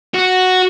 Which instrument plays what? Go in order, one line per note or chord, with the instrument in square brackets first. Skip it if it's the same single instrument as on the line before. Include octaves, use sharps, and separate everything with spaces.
[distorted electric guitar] F#4